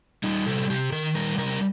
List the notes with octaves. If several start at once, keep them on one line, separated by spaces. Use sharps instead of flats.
G3 D#4
C3 A4
C3 G4
D#3 A#4
G3 A#4
C3 A#4